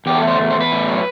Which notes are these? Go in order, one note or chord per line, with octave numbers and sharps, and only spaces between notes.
E2 G4
A4
A3
C5
E2
C5
E2
B4
A2
F#3